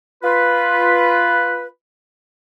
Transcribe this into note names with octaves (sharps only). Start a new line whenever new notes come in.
F4 B4